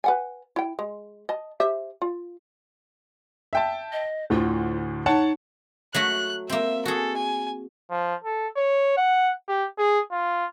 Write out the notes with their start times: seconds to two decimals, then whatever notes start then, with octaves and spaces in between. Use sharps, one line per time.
0.04 B4 F#5 G#5
0.56 E4 G5
0.79 G#3
1.29 D#5 A5
1.60 G4 C5 E5
2.02 F4
3.53 E5 G5 A5
3.92 D#5
4.30 D2 A2 D3 F4
5.06 D#4 C#5 F#5 A5
5.94 F#3 A3 F#4 F#6
6.49 A#3 C4 E5
6.85 F#4 G#4 A4
7.17 G#5
7.91 F3
8.24 A4
8.57 C#5
8.97 F#5
9.48 G4
9.79 G#4
10.12 F4